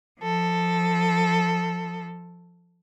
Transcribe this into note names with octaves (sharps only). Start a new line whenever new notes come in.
F3 A4